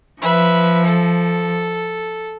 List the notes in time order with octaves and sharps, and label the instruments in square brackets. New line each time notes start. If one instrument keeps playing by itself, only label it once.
[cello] F3 [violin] B4 E5
[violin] A4